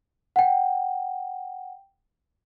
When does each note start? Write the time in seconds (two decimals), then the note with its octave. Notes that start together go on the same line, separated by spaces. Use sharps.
0.36 F#5 G5